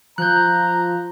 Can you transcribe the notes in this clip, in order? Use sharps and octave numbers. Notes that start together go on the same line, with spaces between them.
F3 A#5 F#6 G6